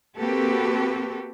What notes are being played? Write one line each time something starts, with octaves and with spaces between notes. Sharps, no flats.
A#3 C4 F#4 G4 A4 B4